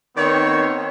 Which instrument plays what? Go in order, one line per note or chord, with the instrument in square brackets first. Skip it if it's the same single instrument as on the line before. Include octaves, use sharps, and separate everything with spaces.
[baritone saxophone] D#3 [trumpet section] B3 C4 C#5